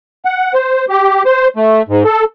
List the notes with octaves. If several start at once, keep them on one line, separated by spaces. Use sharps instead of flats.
F#5
C5
G4
C5
A3
G#2
A4